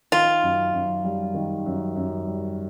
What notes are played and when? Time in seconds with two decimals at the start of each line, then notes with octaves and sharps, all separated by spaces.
0.12 D#3 F4
0.43 F#2
0.73 F#2
1.04 G3
1.34 D#3
1.66 F#2
1.96 F#2
2.27 G3